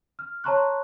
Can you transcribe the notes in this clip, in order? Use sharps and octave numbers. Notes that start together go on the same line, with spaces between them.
F6
C#5 A5 A#5 C6 C#6 F#6